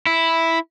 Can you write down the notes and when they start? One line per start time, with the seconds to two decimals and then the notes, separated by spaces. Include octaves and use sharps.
0.07 E4